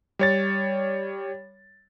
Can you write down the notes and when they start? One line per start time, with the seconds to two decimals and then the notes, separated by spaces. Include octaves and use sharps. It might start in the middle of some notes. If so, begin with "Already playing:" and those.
0.19 G3 C#5 A6